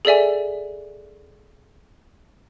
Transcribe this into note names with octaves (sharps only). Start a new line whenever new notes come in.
G#4 A4 D5 E5 G#5